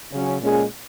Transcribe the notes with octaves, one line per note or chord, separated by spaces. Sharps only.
C#3 F#3 C#4
A#2 G#3 C#4 G#4